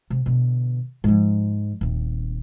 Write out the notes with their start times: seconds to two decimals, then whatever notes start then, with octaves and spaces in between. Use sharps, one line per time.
0.10 C3
0.26 B2 D3
1.04 G#2 F3
1.81 D#1 C4